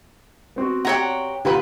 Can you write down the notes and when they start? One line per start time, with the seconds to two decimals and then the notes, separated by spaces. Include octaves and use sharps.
0.56 B3 C4 F#4
0.85 G4 C#5 F#5 A#5
1.45 A#2 D3 F4 G4 B4